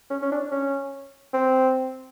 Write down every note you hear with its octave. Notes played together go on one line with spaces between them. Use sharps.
C#4
C#4
D4
C#4
C4